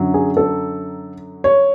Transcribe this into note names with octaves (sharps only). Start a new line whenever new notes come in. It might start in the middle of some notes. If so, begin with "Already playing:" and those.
Already playing: F#2 D3 F#3
G#4
A4
C#5